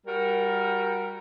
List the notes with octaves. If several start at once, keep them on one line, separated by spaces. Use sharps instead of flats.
G3 F#4 A#4